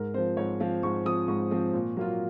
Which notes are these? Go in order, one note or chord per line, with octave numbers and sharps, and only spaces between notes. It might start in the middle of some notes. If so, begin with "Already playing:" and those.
Already playing: G#2 A#4
F3 C4 C5
G#2 C#5
F3 C4 F5
G#2 C#6
F3 C4 D#6
G#2 C#6
F3 C4
A#2
F#3 A#3 F4